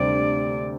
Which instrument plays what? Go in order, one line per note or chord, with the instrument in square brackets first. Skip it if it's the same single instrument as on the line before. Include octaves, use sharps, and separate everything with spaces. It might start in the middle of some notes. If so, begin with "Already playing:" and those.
Already playing: [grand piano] D2 C3 G3 C4 [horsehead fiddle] D5